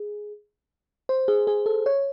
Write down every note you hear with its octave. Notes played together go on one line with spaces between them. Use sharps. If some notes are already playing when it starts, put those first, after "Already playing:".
Already playing: G#4
C5
G#4
G#4
A4
C#5